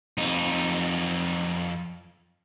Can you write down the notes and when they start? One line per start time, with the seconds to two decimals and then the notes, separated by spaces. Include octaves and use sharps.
0.18 F2 D#4